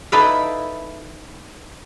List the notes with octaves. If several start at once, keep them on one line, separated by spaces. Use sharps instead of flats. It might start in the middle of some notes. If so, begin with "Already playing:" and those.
D#4 E4 A4 B4 D5 F5